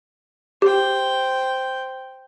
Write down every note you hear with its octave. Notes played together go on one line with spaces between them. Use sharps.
G4 C5 G5